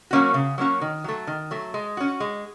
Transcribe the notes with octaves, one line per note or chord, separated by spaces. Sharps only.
F#3 A#3 C#4 F#4
C#3
F#3 A#3 C#4 F#4
D#3
F#3 A3
D#3
F#3 A3
G#3
C#4 F#4
G#3